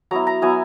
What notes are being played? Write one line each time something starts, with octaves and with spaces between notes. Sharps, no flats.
F#3 B3 E4 A#5
A#5
F#3 B3 E4 G#5